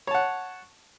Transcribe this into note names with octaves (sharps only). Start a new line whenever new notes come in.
C#5 F#5 A5